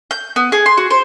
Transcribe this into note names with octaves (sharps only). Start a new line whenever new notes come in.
G6
B3
G#4
C6
F#4
C5